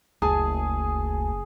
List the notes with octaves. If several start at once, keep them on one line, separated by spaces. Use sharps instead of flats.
F#1 D2 G#4 G#5 A5